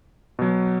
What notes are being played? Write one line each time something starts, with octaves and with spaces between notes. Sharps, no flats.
B2 F#3